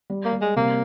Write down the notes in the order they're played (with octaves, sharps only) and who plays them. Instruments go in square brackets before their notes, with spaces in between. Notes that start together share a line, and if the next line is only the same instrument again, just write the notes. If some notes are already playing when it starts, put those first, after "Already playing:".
[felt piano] G3
[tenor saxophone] A#3
[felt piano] G3
[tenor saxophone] G#3
[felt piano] C3 [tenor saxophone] A#3